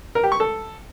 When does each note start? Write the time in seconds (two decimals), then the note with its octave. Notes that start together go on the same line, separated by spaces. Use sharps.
0.15 A#4
0.24 G4
0.32 C#6
0.40 A4